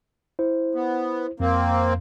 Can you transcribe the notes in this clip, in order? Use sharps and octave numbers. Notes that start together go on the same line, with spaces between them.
E4 C5
B3
F2 A#3 C4